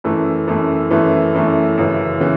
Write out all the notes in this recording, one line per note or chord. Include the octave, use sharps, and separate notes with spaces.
F#2 E3 A3
F#2 E3 A3
F#2 E3 A3
F#2 E3 A3
F#2 C#3 E3
C#3 E3